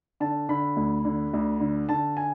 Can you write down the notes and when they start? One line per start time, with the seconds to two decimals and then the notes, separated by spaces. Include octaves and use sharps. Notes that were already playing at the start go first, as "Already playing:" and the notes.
0.20 D3 A5
0.49 D3 B5
0.77 D2
1.05 D3
1.33 D2
1.60 D3
1.89 D3 A5
2.17 G#5